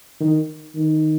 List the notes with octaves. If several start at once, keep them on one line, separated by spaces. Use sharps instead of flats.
D#3
D#3